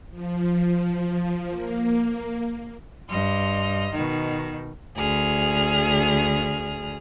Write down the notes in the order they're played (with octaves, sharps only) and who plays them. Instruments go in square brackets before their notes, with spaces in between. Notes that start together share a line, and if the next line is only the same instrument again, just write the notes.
[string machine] F3
A#3
[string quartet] G2 D#5 C6 F6
B2 D#3
D2 G#4 F6